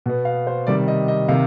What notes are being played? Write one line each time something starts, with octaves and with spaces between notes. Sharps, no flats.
B2 B3
F5
C5
C3 D#3 G3 D5
D#5
D#5
C3 D#3 F5